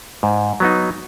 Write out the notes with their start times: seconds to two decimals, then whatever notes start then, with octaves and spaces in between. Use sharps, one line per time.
0.23 G#2
0.60 F#3 B3 D#4